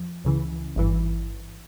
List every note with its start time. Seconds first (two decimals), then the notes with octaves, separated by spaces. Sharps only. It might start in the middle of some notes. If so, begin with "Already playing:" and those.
Already playing: F2 F3
0.24 C#2 C#3 E3
0.76 G#1 G2 E3